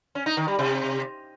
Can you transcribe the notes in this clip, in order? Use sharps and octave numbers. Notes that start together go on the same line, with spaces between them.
C#4
D#4
D#3
G3
C3